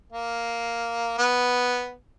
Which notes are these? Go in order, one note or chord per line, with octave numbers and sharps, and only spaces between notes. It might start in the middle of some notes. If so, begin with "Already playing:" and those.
A#3
B3